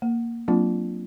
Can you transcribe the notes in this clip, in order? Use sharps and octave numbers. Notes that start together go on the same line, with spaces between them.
A#3
F#3 A#3 C4 D4 F4